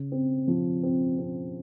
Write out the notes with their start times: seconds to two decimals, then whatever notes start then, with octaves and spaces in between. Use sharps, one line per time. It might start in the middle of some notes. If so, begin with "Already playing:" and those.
Already playing: C#3
0.12 C4
0.47 F3
0.83 C4
1.18 C4